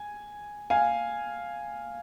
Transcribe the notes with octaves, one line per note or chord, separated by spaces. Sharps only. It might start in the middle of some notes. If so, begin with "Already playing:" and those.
Already playing: G#5
F5 G#5